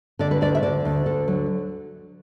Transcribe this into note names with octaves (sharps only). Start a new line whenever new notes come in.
D3 D5
B4
D2 D5
E5
D3 D5
D2
D3 A4
F#3